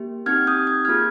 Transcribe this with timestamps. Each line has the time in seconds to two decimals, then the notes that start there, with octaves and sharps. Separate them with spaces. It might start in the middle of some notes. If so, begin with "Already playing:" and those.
Already playing: A#3 G4
0.26 C4 D#4 G4 F6 G#6
0.47 D#6 G6
0.67 G#6
0.85 A#3 F4 G#4 F6 G#6